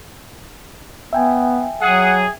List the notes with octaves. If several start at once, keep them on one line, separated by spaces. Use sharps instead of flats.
B3 E5 G5 G#5
F#3 G#4 F#5